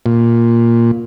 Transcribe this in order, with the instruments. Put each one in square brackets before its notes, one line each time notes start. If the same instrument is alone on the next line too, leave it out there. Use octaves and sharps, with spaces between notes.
[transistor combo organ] A#2